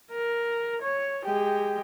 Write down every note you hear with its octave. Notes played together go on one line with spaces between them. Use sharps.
A#4
C#5
G#3 G4